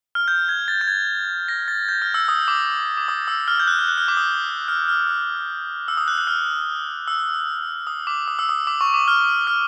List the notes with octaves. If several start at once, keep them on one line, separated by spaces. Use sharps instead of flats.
F6
G6
G#6
A6
G6
G#6
A#6
A6
G6
F6
E6
D#6
D6
D6
D#6
E6
F6
G6
F#6
F6
F#6
F6
D6
D#6
F6
F6
E6
D#6
F#6
F#6
F6
E6
D#6
D6
D#6
E6
D#6
D6
C#6
D6
F6
F6